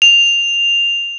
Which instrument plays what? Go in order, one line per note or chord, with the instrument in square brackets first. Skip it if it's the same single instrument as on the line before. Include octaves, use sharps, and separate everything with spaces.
[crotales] F7